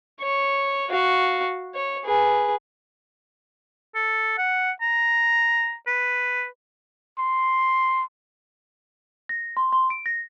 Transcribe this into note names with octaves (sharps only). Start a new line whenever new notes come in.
C#5
F#4 F5
C#5
G#4 B4
A4
F#5
A#5
B4
C6
A#6
C6
C6
D7
A#6